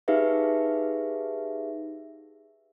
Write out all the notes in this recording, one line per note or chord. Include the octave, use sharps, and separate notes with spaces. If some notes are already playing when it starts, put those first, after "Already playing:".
D#4 G4 G#4 B4 E5 F5